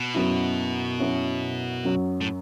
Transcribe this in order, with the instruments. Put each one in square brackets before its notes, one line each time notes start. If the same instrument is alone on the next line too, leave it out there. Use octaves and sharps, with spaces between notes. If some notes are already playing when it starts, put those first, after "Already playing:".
Already playing: [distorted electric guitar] B2
[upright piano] F#2 F#3 B3 E4
F#2 F#3 C#4 E4
F#2 F#3 C#4
[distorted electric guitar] A2